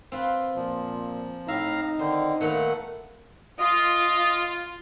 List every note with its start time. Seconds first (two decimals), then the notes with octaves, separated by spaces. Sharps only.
0.12 C4 F4 B4
0.56 A#2 F3
1.48 A2 D#4 E5 F5 A#5
1.99 D3 D#3 C5
2.41 A#2 D#3 A3 B3 F#5
3.59 F4 D#5